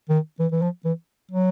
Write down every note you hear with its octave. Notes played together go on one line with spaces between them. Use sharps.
D#3
E3
E3
F3
E3
F#3